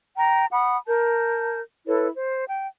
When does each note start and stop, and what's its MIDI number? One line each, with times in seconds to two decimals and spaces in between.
0.17 0.46 79
0.17 0.46 82
0.51 0.78 78
0.51 0.78 83
0.51 0.78 87
0.88 1.59 70
0.88 1.59 81
0.88 1.59 91
1.87 2.08 64
1.87 2.08 69
1.87 2.08 71
1.87 2.08 73
2.15 2.44 72
2.48 2.67 79